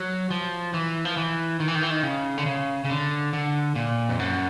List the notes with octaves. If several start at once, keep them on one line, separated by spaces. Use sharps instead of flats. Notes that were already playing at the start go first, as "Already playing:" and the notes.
Already playing: F#3
F3
E3
F3
E3
D#3
E3
D#3
E3
D#3
C#3
D3
C#3
C#3
D3
D3
A#2
F2
F#2